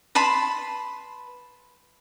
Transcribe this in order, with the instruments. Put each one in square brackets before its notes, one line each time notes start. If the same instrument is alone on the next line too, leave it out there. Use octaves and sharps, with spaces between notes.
[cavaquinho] B4 A5 B5 C6